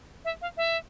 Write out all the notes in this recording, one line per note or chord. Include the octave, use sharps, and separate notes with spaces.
E5
F5
E5